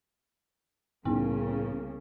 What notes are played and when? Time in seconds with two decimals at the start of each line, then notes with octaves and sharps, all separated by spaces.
1.05 C2 A2 C#3 E3 A#3 B3 E4